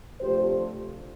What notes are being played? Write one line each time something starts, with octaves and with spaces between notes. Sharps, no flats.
C3 F3 A3 D4 G4 C5